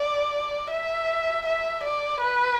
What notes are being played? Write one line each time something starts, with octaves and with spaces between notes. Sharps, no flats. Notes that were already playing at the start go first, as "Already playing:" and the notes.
Already playing: D5
E5
E5
D5
B4